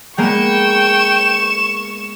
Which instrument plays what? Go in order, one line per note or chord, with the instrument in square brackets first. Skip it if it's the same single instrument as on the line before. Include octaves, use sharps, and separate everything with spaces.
[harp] G#3 A#3 B3 [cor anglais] G5 [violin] C#6 E7